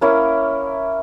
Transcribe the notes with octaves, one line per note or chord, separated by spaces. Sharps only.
A#3 C#4 E4 A#4